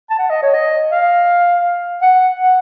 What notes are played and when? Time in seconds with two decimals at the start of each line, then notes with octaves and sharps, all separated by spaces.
0.10 A5
0.18 F#5
0.30 D#5
0.42 C#5
0.54 D#5
0.91 F5
2.02 F#5
2.39 F#5